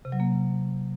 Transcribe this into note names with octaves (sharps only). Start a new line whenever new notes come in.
C3
F#3
A#3